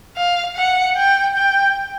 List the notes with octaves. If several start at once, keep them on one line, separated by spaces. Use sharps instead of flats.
F5
F#5
G5
G5